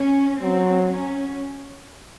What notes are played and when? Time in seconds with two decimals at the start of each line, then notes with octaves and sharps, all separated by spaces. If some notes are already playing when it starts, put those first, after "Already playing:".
Already playing: C#4
0.41 F#3 C4
0.91 C#4